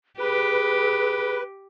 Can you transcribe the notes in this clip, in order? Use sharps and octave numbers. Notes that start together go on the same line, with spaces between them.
G4 G#4 B4